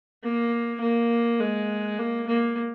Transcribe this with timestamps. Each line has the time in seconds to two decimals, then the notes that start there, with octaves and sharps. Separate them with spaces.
0.23 A#3
0.81 A#3
1.40 G#3
1.99 A#3
2.27 A#3